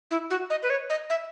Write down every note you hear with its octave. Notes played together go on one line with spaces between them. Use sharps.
E4
F#4
D#5
B4
C#5
D#5
E5